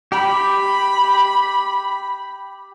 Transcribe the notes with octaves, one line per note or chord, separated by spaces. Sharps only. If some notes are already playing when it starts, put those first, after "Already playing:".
G4 B5